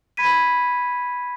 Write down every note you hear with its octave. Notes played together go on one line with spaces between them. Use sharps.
B5 G#6 B6 D#7